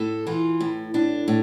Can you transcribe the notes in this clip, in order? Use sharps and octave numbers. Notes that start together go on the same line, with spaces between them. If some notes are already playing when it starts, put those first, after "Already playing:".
Already playing: A2 A4
E3 F4
A2
A2 D4
A2